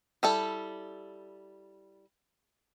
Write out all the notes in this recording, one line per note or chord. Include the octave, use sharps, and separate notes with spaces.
G3 E4 A4